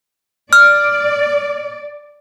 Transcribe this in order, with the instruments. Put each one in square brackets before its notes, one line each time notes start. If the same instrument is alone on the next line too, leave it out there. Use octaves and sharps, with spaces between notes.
[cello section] D5 [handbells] F6